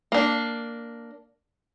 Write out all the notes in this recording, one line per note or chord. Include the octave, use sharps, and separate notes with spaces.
A#3 D4